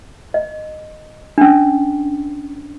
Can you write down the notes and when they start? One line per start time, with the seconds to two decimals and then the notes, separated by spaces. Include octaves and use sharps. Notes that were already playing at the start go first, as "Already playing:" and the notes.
0.34 D#5
1.38 C#4 D4